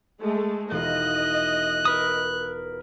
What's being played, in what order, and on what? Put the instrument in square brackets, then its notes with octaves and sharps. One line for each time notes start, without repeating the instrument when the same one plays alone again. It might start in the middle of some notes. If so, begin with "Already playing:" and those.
[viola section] G#3 A3
[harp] E1 D#4 F4 [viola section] D#5 [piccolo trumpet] F#6
[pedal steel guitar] A#4 B4 D#6